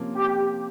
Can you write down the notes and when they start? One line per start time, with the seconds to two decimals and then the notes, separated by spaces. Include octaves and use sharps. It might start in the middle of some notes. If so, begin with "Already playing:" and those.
Already playing: C3 F3 A#3 C#4
0.15 G4